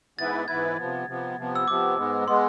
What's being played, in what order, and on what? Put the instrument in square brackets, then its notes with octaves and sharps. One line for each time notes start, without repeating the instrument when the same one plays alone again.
[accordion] G#2 E3 B3 E4 B4 [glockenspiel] A6
[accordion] G#2 E3 B3 E4 B4 [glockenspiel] G#6
[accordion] C3 F3 B3
C3 F3 B3
C3 F3 B3
[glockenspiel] E6
[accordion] C3 F3 B3 [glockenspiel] D6
[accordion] G#2 G#3 B3
[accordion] G#3 B3 [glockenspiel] C6